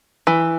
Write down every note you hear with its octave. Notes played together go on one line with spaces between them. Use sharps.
E3